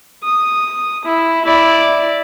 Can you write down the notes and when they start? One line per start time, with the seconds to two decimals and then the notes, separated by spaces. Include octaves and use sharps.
0.23 D#6
1.05 E4
1.44 E4 D5